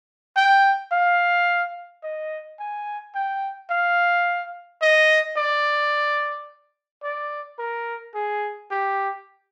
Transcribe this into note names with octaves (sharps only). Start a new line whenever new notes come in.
G5
F5
D#5
G#5
G5
F5
D#5
D5
D5
A#4
G#4
G4